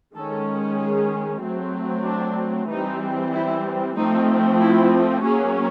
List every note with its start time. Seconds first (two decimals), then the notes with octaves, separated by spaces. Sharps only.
0.15 D#3 G#3 C#4 A4
0.78 G#4
1.42 F#3 A3 C4
2.05 D4
2.69 E3 G3 C4 D#4
3.33 E4
3.96 F3 A3 C4 D#4
4.60 E4
5.23 F#3 A#3 C#4 G#4